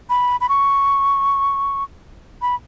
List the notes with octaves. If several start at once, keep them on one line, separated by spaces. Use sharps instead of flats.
B5
B5
C#6
B5